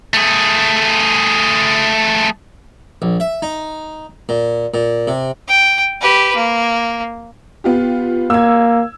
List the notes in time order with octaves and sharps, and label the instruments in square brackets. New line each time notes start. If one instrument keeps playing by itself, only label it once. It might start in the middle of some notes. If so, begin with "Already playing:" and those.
[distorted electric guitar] A3 G#4
[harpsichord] A#1
E5
D#4
A#2
A#2
C3
[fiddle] G5
G4 B4
A#3
[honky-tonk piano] B3 F4 G4
[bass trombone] A#3 [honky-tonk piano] E6 G#6